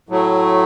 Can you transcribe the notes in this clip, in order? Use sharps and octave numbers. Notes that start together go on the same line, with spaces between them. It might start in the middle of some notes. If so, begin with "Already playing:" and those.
A2 F#3 A3